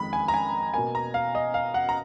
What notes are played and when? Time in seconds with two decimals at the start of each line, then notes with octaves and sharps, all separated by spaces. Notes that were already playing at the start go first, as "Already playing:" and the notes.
Already playing: F2 D#3 G#3 B5
0.13 G#5
0.28 A#5
0.34 G#5
0.74 B2 A#3 G#5
0.95 A#5
1.14 F5
1.35 D#5
1.54 F5
1.74 F#5
1.89 A#5